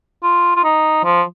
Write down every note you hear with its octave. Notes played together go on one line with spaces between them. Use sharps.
F4
F4
D#4
F3